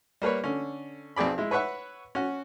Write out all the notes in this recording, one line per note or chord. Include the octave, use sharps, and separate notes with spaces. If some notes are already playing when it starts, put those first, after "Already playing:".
G3 A#3 B4 C#5
D3 C#4
B1 C4 G#4 D5 B5
G#3 E4
B4 C#5 E5 F#5 C#6
C#4 F#4